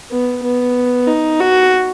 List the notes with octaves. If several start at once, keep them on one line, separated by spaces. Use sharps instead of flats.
B3
B3
D#4
F#4